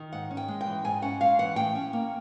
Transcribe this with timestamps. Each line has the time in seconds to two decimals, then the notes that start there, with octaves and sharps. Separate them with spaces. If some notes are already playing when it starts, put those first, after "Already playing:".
Already playing: D#3
0.13 G#2 F#5
0.31 C#4
0.37 G5
0.48 G#3
0.61 G5
0.66 E3
0.84 G#2 G#5
1.02 C#4 F#5
1.21 G#3 F5
1.39 E3 F#5
1.56 A2 G5
1.75 C#4
1.93 A#3